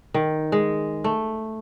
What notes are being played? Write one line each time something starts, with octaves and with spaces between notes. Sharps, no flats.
D#3
G#3
A3